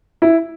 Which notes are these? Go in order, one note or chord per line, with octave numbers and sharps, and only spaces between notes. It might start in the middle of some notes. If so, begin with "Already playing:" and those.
E4